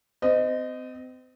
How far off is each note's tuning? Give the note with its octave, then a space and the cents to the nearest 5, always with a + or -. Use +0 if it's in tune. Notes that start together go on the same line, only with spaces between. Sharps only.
C4 -35 D#5 -5